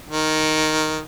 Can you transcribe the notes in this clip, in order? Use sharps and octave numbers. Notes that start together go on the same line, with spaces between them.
D#3